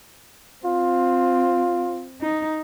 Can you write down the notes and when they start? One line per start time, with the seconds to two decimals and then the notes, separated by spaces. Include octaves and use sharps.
0.65 C4 F4
2.21 D#4